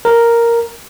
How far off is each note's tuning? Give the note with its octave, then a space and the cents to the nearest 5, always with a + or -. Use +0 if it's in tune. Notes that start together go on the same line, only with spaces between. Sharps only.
A#4 +0